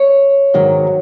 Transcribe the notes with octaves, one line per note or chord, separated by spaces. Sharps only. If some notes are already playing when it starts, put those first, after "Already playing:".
Already playing: C#5
G#2 D#3 F#3